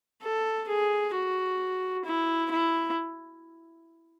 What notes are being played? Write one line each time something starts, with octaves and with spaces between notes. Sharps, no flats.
A4
G#4
F#4
E4
E4